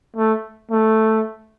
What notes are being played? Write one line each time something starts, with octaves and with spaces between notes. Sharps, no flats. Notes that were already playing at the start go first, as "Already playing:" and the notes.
A3
A3